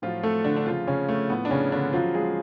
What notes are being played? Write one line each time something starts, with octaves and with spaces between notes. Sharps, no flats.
A2 F3 F#3 F4
A3 A4
D3 D4
D4
C#3 F3 F4
C#3 C#4
A3
A2 F3 B3
D4
C#3 C#4
D3 D4
C#3 F3 F#3 F4
G#3 G#4